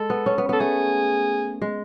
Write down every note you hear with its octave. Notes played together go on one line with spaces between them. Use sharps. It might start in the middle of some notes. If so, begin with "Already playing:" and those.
Already playing: G#3 A4
B3
C#4
B3
B3 A4
A3 G#4
G#3